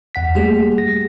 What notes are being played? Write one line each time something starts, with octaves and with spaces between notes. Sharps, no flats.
E2 F#5 B6
G3 A3 A#3 G4 G#4
A#6